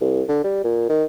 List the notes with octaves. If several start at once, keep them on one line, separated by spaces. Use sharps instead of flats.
C2
D3
G3
A#2
D#3